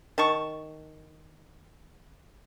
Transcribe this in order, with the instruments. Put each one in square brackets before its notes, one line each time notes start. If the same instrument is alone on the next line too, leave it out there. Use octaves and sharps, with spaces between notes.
[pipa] D#3 A5 C#6